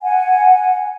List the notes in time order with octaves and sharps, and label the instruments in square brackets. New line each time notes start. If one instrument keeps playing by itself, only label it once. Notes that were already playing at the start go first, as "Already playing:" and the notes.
[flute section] F#5 G#5